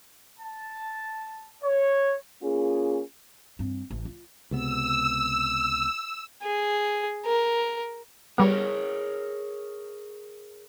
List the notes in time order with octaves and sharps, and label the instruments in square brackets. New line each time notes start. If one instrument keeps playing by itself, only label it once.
[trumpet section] A5
C#5
[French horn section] A#3 C#4 F4 G#4
[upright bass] G2 C4
A1
F4
[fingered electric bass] C#2 C3 B3 [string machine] E6
[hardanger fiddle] G#4
A#4
[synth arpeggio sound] G3 B3 [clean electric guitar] G#4 A#4 C#5